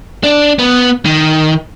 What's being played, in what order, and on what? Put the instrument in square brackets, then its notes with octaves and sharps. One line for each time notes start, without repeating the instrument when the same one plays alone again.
[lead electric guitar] D4
B3
D#3